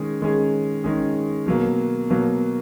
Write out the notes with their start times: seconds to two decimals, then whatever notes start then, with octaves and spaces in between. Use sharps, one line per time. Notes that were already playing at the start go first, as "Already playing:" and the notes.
Already playing: D#3 G#3 C#4 G#4
0.21 D#3 G#3 C#4 G#4
0.84 D#3 G#3 C#4 G#4
1.46 B2 F#3 A#3
2.10 B2 F#3 A#3